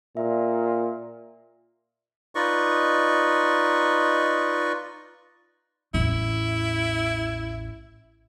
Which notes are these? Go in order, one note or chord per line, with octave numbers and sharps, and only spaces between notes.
A#2 E5
D#4 F4 B4 D5 D#5 C#6
A1 E2 E4